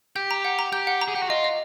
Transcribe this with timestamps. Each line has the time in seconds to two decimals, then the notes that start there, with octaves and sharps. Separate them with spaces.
0.16 G4 G6
0.31 A#5
0.45 F#5
0.59 A#5
0.72 G4 G6
0.87 F#5
1.01 A#5
1.08 G#4
1.15 G4 F#5
1.23 F#4
1.30 F4 D#5
1.44 D#5